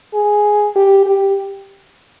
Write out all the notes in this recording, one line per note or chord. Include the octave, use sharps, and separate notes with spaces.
G#4
G4
G4